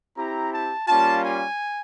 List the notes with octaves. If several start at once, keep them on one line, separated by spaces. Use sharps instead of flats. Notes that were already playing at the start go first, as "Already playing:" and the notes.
C4 E4 G4 A#5
A5
G3 A#3 C#4 F4 A5
G#5